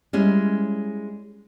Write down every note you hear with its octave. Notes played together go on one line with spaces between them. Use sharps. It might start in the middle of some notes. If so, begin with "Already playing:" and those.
G3 G#3 C#4 E4